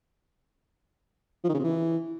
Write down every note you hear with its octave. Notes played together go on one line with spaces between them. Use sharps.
F3
D#3
C#3
C3
E3